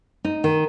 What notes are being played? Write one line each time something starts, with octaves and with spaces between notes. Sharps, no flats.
D#4
D#3